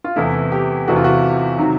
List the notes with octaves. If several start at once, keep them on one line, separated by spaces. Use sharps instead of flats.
F4
E2 C3 E3 A3 E4
G4
E2 C3 E3 A3 F#4
F4
F#4
C3 D#3 F#3